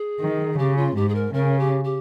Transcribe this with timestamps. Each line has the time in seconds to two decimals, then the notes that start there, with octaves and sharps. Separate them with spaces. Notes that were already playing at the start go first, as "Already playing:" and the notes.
Already playing: G#4
0.21 D#3
0.58 C#3 G4
0.77 F4
0.96 G#2 G4
1.09 G#4
1.15 A#4
1.34 C#3 A#4
1.59 G4
1.84 G4